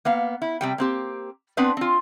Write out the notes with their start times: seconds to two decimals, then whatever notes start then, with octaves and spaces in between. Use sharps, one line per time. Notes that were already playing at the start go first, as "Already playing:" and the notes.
0.05 A#3 B3 F5
0.42 E4
0.61 C3 G3 G5
0.78 A#3 C4 G4
1.57 B3 C4 D4 B4 C5
1.77 C4 F4